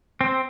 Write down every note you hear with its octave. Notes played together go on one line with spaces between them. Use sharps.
C4